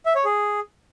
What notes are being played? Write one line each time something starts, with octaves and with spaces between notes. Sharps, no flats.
E5
C#5
G#4